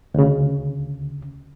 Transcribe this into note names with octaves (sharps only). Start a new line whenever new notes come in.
D2 C#3